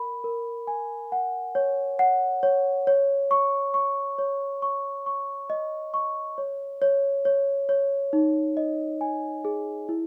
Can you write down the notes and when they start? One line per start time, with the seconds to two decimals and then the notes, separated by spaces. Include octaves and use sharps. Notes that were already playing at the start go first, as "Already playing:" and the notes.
Already playing: A#4 B5
0.24 A#4
0.67 G#5
1.12 F#5
1.55 C#5
1.99 F#5
2.43 C#5
2.87 C#5
3.31 C#6
3.74 C#6
4.19 C#5
4.62 C#6
5.06 C#6
5.50 D#5
5.94 C#6
6.38 C#5
6.82 C#5
7.25 C#5
7.69 C#5
8.13 D#4
8.57 D#5
9.01 G#5
9.45 G#4
9.89 E4